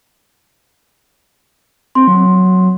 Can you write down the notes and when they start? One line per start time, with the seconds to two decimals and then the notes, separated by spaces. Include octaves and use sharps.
1.95 C4 C6
2.08 F#3